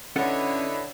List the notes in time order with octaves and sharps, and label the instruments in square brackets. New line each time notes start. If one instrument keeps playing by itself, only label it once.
[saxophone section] D3 [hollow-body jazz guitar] C#4 A4 F#5 [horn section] E4 B4 D#5 [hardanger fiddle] C#5